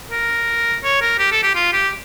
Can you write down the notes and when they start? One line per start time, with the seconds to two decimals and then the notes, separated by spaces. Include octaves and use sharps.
0.11 A#4
0.84 C#5
1.01 A#4
1.19 G4
1.32 A4
1.43 G4
1.55 F4
1.73 G4